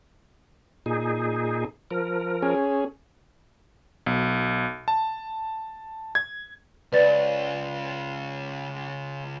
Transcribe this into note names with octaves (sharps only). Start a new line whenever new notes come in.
A#2 D#4 G#4
F3 A#4
C#4 G#4
B1
A5
G#6
C#2 B4 D5 A6